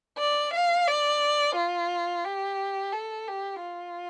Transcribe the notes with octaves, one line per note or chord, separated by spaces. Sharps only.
D5
F5
D5
F4
G4
A4
G4
F4